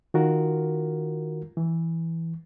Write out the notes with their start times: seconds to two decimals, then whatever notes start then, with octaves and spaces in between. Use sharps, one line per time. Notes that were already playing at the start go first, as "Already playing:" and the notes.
0.14 D#3 F4 F#4 A#4
1.57 E3